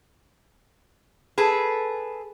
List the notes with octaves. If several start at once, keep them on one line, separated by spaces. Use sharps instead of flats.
G#4 A4 B4